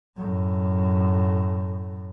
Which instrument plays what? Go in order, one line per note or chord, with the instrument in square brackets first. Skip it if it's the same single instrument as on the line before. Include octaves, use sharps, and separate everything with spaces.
[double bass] F#2 A2